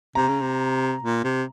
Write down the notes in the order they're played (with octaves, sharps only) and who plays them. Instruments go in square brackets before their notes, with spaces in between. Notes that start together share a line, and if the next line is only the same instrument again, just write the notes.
[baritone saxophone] C3 [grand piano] A#5
[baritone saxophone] C#3
C3
A#2
C3